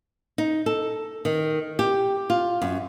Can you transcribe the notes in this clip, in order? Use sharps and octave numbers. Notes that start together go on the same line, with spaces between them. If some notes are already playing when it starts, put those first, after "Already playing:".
D#4
A4
D#3
G4
F4
F#2